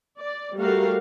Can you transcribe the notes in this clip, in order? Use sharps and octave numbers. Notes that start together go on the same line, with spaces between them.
D5
G3 A3 F#4 A#4 F5